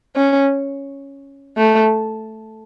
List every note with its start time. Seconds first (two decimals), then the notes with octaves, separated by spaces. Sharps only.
0.16 C#4
1.58 A3